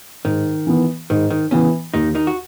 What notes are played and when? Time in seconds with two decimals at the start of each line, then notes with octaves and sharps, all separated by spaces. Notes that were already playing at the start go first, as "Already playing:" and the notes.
0.25 G#2 D#3
0.67 E3 B3
1.10 G#2 D#3
1.30 D#3
1.51 C#3 E3 B3 C#4
1.94 D#2 D#3 D#4
2.15 D#3 D#4
2.27 F#4